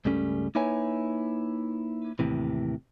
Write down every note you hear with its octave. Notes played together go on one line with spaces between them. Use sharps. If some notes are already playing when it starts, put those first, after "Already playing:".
C#2 G2 C#3 G3 A3 C#4
A#3 D#4 E4 B4 C#5 G#5
D#2 A2 C3 E3